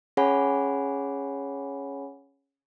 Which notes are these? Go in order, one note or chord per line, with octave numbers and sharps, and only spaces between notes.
C#4 G#4 C#5 F#5 G#5 B5